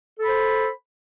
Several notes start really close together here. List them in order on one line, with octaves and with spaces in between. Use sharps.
A4 B5 C5